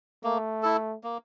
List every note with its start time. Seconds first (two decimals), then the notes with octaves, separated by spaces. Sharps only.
0.24 A3 A#3
0.63 E4 A4
1.04 A#3